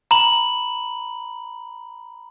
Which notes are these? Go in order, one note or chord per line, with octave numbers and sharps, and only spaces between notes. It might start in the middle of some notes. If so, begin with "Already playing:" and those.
A#5 B5 F#7